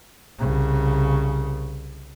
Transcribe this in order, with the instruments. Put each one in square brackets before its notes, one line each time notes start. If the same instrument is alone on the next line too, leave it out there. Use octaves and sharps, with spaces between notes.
[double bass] C2 C#3